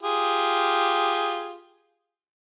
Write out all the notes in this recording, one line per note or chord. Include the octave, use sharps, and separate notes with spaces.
F4 G4 G#4